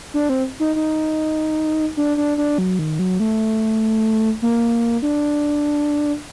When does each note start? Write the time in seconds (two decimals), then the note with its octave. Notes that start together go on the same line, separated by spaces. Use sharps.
0.14 D4
0.29 C4
0.60 D#4
0.76 D#4
1.97 D4
2.17 D4
2.38 D4
2.58 F#3
2.79 D#3
2.99 F#3
3.20 A3
4.42 A#3
5.02 D4